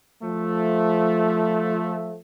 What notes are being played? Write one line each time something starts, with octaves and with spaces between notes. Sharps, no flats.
F3 A3